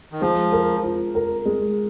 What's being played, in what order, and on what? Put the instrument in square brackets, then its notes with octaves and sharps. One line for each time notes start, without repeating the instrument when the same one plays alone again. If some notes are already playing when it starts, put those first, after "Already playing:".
[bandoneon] D#3
[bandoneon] F3 [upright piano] G#3
[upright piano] A#4
F4
A#4
G#3